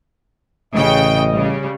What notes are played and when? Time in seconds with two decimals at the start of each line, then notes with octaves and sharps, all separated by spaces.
0.74 A1 C#3 D#5 G5
1.32 C#3 G3